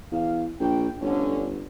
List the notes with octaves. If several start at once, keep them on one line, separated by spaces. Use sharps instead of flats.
E2 F5
A#1 G5
G1 F2 D3 C#4